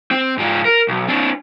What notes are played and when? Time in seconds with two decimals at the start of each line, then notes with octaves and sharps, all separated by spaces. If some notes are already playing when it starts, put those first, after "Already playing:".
0.11 C4
0.38 G#2 F4
0.65 A#4
0.89 B1
1.09 C4 D4